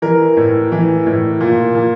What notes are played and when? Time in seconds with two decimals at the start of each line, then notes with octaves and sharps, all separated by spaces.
0.02 E3 A#4
0.37 A2
0.72 E3
1.06 A2
1.40 A#2
1.75 A#2